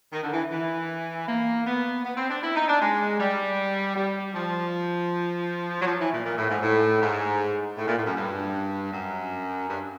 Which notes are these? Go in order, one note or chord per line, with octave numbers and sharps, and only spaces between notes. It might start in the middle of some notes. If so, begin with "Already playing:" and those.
D#3
D3
E3
E3
A#3
B3
B3
C4
D4
E4
D#4
D4
G#3
G3
G3
F3
F#3
F3
E3
A#2
A#2
A2
G#2
A2
G#2
A2
A#2
A2
F#2
G2
F#2
G2